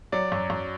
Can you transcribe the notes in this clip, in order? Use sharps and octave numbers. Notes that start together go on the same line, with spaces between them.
F#3 D5
F#2
F#2